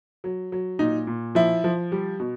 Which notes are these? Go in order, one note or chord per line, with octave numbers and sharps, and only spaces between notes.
F#3
F#3
A#2 D#4
A#2
F3 E4
F3
G3
B2